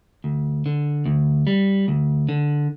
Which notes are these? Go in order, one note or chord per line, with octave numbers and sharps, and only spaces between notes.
D2
D3
D2
G3
D2
D3